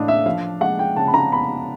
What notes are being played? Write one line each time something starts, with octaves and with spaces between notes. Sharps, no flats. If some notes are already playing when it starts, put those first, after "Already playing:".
Already playing: A2 E3 D4 D#5 F5
E5
F3 F5
G#3 F#5
G5
C#3 A5
B5
A#5
B3 B5